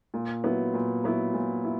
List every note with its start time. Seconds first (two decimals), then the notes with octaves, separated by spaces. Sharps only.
0.14 A#2
0.44 F#3 B3 E4
0.74 A#2
1.04 F#3 B3 E4
1.34 A#2
1.64 E4